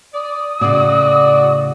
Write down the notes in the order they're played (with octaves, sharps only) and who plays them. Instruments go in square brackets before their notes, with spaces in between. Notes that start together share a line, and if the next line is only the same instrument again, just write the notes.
[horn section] D5 [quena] D#6
[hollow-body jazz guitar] A2 C#3 [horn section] F#4 D5